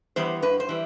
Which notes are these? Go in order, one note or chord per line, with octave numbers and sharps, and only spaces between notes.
E3 G3 B3 C5
G2 B4
C5
E3 G3